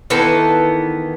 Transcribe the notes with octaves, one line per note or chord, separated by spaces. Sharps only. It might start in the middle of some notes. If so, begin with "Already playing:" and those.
D#3 E3 B3 A4